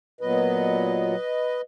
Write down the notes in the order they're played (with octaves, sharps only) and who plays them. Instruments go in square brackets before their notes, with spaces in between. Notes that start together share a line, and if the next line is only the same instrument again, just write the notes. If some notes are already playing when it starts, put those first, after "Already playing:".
[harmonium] A#2 F#3 B3 B4 D#5